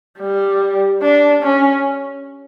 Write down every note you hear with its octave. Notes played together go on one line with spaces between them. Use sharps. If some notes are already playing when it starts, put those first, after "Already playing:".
G3
D4
C#4